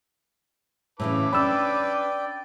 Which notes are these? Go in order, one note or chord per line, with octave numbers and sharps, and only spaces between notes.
A2 C#3 E3 E4 B4 A5 D6
C#4 D4 D5 G5 B5 E6